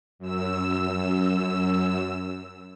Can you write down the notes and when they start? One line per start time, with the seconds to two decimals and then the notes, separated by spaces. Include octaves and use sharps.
0.19 F#2 E6